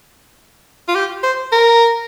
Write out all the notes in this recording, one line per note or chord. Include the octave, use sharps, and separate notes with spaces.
F4
G4
C5
A#4